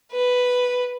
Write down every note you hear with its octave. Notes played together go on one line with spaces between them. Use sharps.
B4